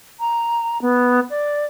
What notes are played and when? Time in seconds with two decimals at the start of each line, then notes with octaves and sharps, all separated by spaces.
0.20 A#5
0.82 B3
1.30 D5